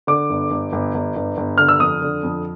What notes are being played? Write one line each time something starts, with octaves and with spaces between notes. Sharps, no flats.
D3 D6
G1
G1
G1
G1
G1
G1
D3 F6
E6
F2 D#6
D3
F2